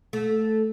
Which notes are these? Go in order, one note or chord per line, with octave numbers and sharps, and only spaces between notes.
A3